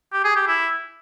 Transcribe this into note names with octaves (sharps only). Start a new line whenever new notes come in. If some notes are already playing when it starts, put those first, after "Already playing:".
G4
G#4
G4
E4